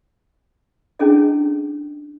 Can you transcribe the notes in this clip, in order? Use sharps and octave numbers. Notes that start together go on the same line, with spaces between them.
C#4 D4 E4 G#4 A4 D#5